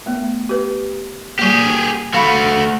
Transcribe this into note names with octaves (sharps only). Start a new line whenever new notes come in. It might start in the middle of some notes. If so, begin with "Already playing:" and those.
A3 B3
G4 B4
G3 A#3 G4 G#4
A3 F#4 F5 B5 C#6